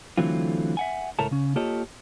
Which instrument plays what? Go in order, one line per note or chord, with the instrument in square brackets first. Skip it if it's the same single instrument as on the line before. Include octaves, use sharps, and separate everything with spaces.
[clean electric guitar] D3 E3 F#3 A3 C4 F4
E5 F#5 G#5
C#2 A2 A3 A#4 C#5 A5
C#3 C#4
A#3 F4 G4 A4 C#5 D#5